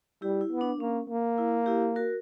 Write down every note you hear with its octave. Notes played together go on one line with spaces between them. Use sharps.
G3 E4 G4
E4
B3
D4
A#3 C#4
A#3
E4
E4 G4
F#4 A#4